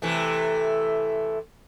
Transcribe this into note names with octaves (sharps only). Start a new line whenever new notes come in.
C3 E3 A3